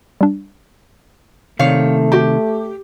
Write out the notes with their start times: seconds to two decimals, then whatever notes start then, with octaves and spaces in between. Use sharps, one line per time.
0.21 G3 D4
1.59 C3 D#3 A3 C#5 F5
2.12 D#4 F#4 G4